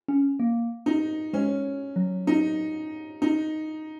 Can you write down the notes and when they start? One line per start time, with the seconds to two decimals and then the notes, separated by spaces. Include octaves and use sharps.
0.08 C#4
0.40 A#3
0.86 D#4
1.33 G#3 C#4
1.96 F#3
2.27 D#4
3.22 D#4